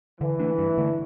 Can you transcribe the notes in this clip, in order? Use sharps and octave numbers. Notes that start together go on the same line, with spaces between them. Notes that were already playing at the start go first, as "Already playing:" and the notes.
D3 E3
A3 D4
G2
D3 A3